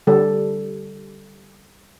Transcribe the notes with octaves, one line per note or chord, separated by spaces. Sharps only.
D3 G3 A4